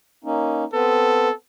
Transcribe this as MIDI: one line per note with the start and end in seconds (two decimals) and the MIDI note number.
0.24 0.64 58
0.24 0.64 61
0.24 0.64 63
0.73 1.29 59
0.73 1.29 60
0.73 1.34 69
0.73 1.29 71